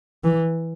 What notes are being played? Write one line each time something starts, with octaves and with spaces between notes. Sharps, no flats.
E3